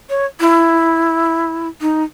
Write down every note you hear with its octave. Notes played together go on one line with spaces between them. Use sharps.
C#5
E4
D#4